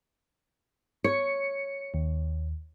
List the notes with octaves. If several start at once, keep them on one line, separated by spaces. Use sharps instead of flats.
C#5 C#7
D#2